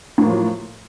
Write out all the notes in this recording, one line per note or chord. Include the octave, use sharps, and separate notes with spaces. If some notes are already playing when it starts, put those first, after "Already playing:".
A2 F3 F#3 A#3